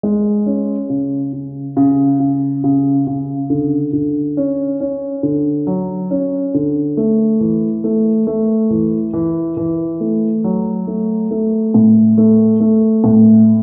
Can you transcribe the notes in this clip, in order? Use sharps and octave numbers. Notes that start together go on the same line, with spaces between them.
G#3
C#4
C#3
C#3
C#3
C#3
C#3
C#3
D3
D3
C#4
C#4
D3
F#3
C#4
D3
A3
E3
A3
A3
E3
E3
E3
A3
F#3
A3
A3
A2
A3
A3
A2